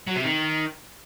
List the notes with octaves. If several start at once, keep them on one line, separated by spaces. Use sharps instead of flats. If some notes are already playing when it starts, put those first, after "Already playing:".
F#3
C3
D#3